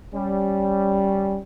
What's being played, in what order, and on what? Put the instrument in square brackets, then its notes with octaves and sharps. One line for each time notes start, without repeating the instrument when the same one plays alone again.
[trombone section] G3 C#4